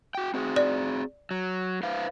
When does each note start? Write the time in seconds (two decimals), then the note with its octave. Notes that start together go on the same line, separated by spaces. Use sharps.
0.15 F#4 G5
0.34 C4 F#4 G#4
0.56 D5
1.31 F#3
1.83 B4 C5 F5